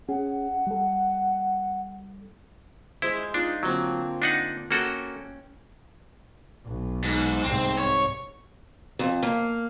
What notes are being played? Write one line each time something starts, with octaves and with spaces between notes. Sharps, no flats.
C#4 G#4 F#5
G3 A4
G#3 E4 C5
D4 D#4 F4
D3 F#3 A#3 C4
D4 D#4 F#5
A#3 C#4 F#4 A4 G5
B1
G#2
C2 G#2 C4
C#5
F2
A#3